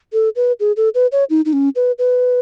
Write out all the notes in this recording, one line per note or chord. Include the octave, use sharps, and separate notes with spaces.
A4
B4
G#4
A4
B4
C#5
D#4
D#4
C#4
B4
B4